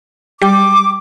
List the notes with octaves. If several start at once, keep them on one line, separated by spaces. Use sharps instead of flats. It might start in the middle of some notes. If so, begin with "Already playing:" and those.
G3 G5 D6